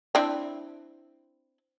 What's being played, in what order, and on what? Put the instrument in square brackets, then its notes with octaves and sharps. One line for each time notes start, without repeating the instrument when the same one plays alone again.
[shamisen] C4 D4 E4